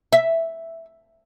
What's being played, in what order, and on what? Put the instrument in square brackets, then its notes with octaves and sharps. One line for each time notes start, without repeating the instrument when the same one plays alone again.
[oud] E5